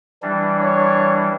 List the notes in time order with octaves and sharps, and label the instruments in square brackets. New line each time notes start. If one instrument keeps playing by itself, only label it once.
[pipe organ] E3 G3 D4
[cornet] C#5